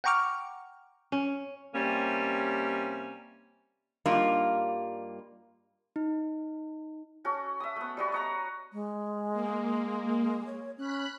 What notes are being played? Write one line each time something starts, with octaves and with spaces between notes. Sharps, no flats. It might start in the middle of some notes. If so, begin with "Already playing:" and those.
F#5 G5 A#5 C#6 D6 F6
C#4
C3 G3 A#3 C#4
G2 G3 A#3 D#4 F4
D#4
C#4 F#4 A4
E5 D#6
A3 B3
G3 B3 F#4
D#5 F#5 A#5
G#3
A#3
C#5
C#4 B5 F#6